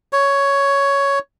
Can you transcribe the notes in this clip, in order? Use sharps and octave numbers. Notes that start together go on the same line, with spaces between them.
C#5